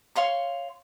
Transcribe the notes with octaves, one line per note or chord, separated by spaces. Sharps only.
C#5 F5 C6 C#6